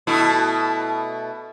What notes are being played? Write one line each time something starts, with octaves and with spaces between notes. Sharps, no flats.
B2 A3 E4